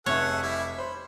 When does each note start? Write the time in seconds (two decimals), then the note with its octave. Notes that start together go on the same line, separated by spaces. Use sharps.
0.06 F1 G#4 A4 C#5 E5 F#5
0.42 G3 E4
0.78 C5 B5